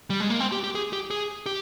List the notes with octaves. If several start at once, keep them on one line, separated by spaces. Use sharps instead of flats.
G3
G#3
A#3
C4
G4
G4
G#4
G4
G#4
G4